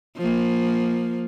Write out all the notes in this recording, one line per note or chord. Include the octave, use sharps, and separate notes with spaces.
F3 A#3